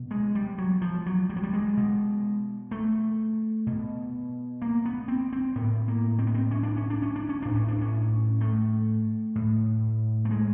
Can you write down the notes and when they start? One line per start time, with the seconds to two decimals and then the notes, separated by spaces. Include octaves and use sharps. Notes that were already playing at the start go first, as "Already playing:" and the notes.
Already playing: B2
0.11 G#3
0.35 G3
0.58 F#3
0.81 F3
1.06 F#3
1.29 G3
1.36 F#3
1.43 G3
1.53 G#3
1.77 B2
2.71 A3
3.67 B2
4.62 A#3
4.85 B3
5.08 C4
5.33 C4
5.55 A2 B3
5.88 A#3
6.19 C4
6.27 B3
6.34 C4
6.51 C#4
6.63 D4
6.77 C#4
6.90 D4
7.02 C#4
7.16 D4
7.29 C#4
7.42 A2 D4
7.55 C#4
7.68 D4
7.81 C#4
8.41 A3
9.35 A2
10.25 A3
10.31 G#3